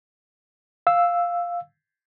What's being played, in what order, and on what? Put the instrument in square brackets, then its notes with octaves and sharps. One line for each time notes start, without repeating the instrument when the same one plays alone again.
[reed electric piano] F5 E6